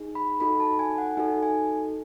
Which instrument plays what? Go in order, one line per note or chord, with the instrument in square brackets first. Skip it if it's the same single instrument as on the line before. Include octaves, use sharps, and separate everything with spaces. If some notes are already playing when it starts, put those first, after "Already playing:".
Already playing: [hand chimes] D#4 G#4
B5
D#4 F#4 A4 B5
A5
G#5
F#5
D#4 F#4 A4 G#5
G#5